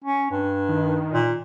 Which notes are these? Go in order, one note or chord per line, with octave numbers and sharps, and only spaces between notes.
C#4
G2
D#3
A#2